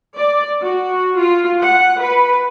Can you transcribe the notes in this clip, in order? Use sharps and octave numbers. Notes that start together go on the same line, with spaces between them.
D5
F#4
F4
F#5
B4